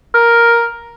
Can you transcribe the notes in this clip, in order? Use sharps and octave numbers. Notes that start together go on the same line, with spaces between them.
A#4